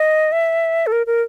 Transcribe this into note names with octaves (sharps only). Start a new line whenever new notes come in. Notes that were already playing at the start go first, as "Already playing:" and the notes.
Already playing: D#5
E5
A4
A#4
A#4